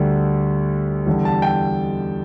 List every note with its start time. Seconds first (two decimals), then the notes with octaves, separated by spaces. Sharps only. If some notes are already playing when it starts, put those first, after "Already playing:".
Already playing: D2 D3 G3
1.06 E2 D3 G3
1.25 A5
1.42 G5